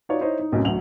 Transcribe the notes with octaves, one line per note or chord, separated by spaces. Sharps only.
D#4 F4 F#4 C#5 D5
D#4 E4 C5 C#5 D#5
D#4
B1 F#2 A2 C3
A1 D2 F#3 F7 F#7